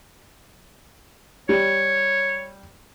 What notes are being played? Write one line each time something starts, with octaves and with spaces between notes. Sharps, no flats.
G3 C#5